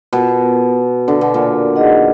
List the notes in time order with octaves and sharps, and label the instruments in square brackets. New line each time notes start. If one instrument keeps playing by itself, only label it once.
[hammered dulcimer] B2 [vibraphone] B3 F4 A#4
[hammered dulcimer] D3
B2
A#2
[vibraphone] D#4 G#4 D#5 F#5